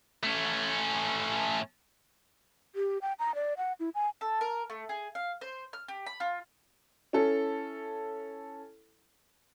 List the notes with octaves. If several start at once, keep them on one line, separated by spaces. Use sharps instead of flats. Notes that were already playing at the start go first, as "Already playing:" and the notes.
A3 C#4
G4
G5
A#5
D5
F#5
E4
G#5
A4
A#4
A3
G#4
F5
C5
F6
G4
B5
F4
C#4 E4 A4